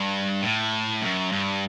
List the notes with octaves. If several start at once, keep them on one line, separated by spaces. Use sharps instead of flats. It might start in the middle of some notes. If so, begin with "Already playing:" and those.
Already playing: G2
A2
F#2
G2